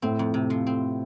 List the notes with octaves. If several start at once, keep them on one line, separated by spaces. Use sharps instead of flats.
A2 C4
F2
C3
F3
C4